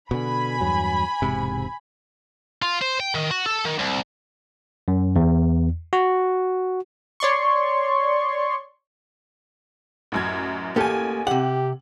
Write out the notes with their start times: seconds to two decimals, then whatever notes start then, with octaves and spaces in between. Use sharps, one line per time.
0.11 B2 D3 G#5 B5
0.61 E2 G2 F#3
1.22 E1 G#2 C3
2.62 F4
2.82 C5
3.00 G5
3.15 D#3
3.31 F#4
3.46 A4
3.65 D#3
3.79 C2
4.88 F#2
5.16 E2
5.93 F#4
7.20 C#5 D5 C6 C#6
10.12 A1 F#2 G#6
10.76 A1 A#3 G4 A4 G#5
11.27 C3 G4 F#5 F#7